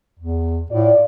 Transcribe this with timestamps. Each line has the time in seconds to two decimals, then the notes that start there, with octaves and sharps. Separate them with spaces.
0.19 E2
0.71 A2 F4 D5